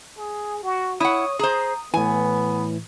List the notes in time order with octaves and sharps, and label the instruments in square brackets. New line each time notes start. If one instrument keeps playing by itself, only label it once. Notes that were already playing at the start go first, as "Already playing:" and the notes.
[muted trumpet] G#4
F#4
[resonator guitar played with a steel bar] E4 F#5 [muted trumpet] C#5 [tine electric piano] D#6
[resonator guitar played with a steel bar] G#4 C5 [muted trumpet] A#5
[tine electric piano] A2 E3 [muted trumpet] B3 [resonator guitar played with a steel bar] G#5